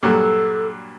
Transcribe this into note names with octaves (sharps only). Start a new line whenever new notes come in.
G2 A#2 F#3 A4